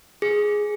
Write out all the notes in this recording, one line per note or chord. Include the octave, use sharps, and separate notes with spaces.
G#4